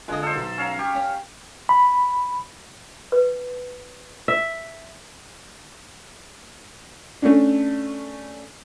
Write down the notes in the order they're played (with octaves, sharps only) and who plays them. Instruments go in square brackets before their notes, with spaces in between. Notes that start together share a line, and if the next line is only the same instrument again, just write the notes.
[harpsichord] F2 D3 D#5 [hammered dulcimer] G#3
[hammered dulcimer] A4 C5
[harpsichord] B1
[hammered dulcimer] C#4 F5 A#5
[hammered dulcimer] G4 [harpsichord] C#6
[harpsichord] C#4
[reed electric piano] B5
[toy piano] B4
[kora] E5
[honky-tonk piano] A3 C#4 D4